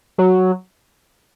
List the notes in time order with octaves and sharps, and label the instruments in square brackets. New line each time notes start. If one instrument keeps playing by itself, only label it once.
[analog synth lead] F#3